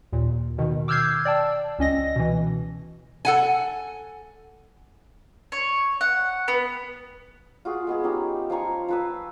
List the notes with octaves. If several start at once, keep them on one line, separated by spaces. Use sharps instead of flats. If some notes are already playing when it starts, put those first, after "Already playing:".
D#2 A#2
B2 D#3
D6 E6 F6 G6 G#6 C7
D5 G5 A5 E6
C#2 C#4 D#5 A#6
B2 E3
A4 F#5 G#5
C#5
F#5
B3
F4 F#4 G#4
G#3 B3 G#4
C#4 D#4 G4
F3 G#5 A#5 C#6
F3 B4 E6